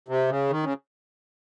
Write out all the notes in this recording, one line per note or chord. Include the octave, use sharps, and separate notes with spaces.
C3
C#3
D#3
C#3